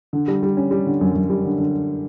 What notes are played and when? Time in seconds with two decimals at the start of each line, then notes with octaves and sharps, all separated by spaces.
0.13 D3
0.28 G3
0.43 G3
0.57 C#4
0.71 G3
0.87 D3
1.01 F#2
1.15 F#2
1.30 G3
1.45 D3
1.58 D3